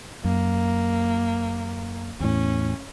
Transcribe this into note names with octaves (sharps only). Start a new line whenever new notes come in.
F#2 A#3
E2 A2 C#4